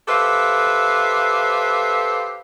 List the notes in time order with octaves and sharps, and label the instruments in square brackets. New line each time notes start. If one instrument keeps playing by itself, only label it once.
[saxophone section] G4 A4 B4 C5 E5 F5